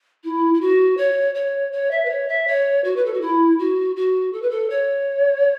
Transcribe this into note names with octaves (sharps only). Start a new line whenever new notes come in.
E4
E4
F#4
C#5
C#5
C#5
E5
B4
C#5
E5
C#5
F#4
B4
A4
F#4
E4
F#4
F#4
A4
B4
A4
C#5